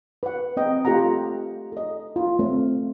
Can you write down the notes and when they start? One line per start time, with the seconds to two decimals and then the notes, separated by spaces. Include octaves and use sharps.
0.23 B4 F#5
0.57 C4 D#5 G5
0.85 A3 F4 G4 A4 F#5 A#5
1.72 A4 D#5
2.16 F4
2.39 A3 C4